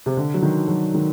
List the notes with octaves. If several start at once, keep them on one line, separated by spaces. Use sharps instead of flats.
C3
D3
F#3
D#3
F#3
D#3